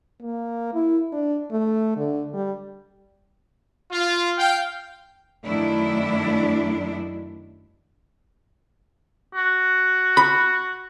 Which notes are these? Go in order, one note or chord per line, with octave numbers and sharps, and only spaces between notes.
A#3
E4
D4
A3
D3
G3
F4
F5 G5
F#2 D#3 A3 D4 E4
F#4
B5